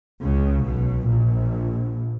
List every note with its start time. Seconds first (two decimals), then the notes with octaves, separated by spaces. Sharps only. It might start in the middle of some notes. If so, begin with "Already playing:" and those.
0.22 C#2 C#3
0.64 B1 B2
1.08 A#1 A#2